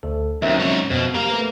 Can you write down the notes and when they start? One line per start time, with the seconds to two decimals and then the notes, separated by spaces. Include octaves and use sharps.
0.03 D2 A4
0.42 D#2 F#3 C4 C#4 A#4 E5
0.59 G#2 C#5
0.90 F2 B2 C5
1.14 A#3 G4 F5
1.29 A3 B4